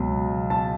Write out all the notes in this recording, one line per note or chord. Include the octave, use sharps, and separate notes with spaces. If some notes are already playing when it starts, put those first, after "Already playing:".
Already playing: C#2 B2 F#3
A5